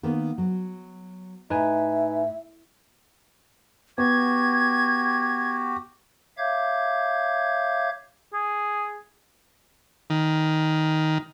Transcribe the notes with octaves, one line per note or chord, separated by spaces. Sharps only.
D#3 A#3 B3
F#3
A2 D#4 B4 E5 G#5
B3 F#4 G4 G#6
C#5 E5 F5 D6 G6 G#6
G#4
D#3